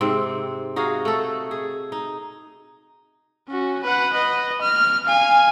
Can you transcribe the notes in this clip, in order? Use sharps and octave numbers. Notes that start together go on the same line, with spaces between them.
G#2 C3 C4
D#4 F#4 G#4 F5
A3 A4
G#4
D#4
C#4 F#4
B4 F#5
B4 D#5
F6
F5 G#5